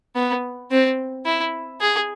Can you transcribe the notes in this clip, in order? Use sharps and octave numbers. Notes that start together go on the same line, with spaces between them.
B3
C4
E4
G#4